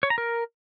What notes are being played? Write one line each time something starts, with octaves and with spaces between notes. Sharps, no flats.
C#5
A#5
A#4